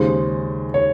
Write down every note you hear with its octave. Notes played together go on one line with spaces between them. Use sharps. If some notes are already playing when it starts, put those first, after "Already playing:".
Already playing: D#2 C#3 G#3 C5
C#5